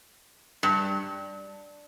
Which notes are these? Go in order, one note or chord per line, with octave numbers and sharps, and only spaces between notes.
G2